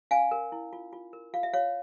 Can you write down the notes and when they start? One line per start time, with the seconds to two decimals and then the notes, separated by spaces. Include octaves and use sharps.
0.11 C#4 F5 G#5
0.31 A#4
0.52 E4
0.73 F4
0.93 F4
1.13 A#4
1.34 F4 F5
1.43 E5
1.53 F4 C#5 F5